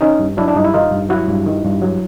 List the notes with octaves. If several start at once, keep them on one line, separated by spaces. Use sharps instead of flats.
D#3 C#4 D#4
G2
F#3 D4 E4
D4
G2 D#4
E4
D#3 D#4 F4
G2
F#3 E4 F#4
G2
D#3
G2
F#3